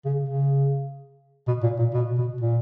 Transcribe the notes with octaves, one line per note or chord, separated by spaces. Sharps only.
C#3
C#3
B2
A#2
A#2
B2
B2
A#2